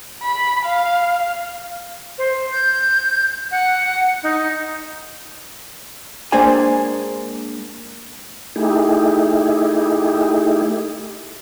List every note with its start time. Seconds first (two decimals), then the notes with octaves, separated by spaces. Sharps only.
0.23 B5
0.66 F5
2.18 C5
2.52 G6
3.51 F#5
4.23 D#4
6.32 G#3 A#3 D4 G#4 C5 G#5
8.56 A3 D#4 E4 G4 G#4